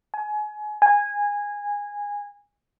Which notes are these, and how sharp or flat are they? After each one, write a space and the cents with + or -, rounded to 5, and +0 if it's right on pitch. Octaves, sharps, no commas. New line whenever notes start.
G#5 +30
G#5 -15